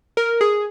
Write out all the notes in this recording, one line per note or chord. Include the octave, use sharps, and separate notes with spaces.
A#4
G#4